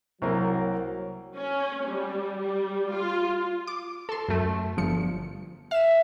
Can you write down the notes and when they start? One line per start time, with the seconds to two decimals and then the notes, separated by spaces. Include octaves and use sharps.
0.22 C2 F#3 A#3
1.38 C#4
1.87 G3
2.40 G3
2.95 F4
3.67 D6
4.09 A4 C6
4.28 F#2 A3
4.77 G1 F3 C#7
5.71 E5 F5 E7